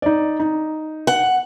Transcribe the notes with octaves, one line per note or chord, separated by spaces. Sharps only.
D#4 D5
D#4
F#5